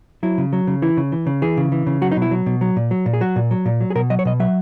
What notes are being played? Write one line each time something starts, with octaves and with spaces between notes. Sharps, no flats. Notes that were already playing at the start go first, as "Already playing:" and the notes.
F#3 E4
C#3
F#3
C#3
E3 E4
C#3
E3
C#3
E3 G#4
C#3
E3
C#3
F#3 F#4
D#4
B2
E4
F#3
B2
F#3
A#2
F#3
A#2
G#4
F#3 F#4
A#2
F#3
A#2
F#3
G#4
B2 A#4
F#3 D#5
C#5
B2 D#5
F#3 E5